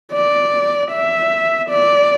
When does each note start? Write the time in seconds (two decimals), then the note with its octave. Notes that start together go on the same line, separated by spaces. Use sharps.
0.13 D5
0.91 E5
1.70 D5